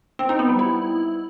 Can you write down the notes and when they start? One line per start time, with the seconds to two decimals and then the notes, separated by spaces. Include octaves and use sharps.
0.19 C4
0.29 D#4
0.39 B3
0.49 G3
0.59 E4